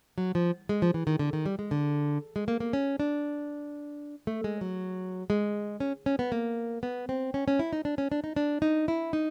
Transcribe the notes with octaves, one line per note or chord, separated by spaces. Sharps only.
F#3
F3
G#3
F3
E3
D#3
D3
D#3
G3
G#3
D3
G#3
A#3
A#3
C#4
D4
A3
G#3
F#3
G#3
C#4
C#4
B3
A#3
B3
C4
C#4
C#4
E4
D#4
D4
C#4
D4
D#4
D4
D#4
E4
D#4